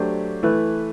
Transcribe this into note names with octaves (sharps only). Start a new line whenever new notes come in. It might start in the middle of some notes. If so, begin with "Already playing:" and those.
Already playing: F#3 A3 D4 G4 C5
E3 A3 E4 B4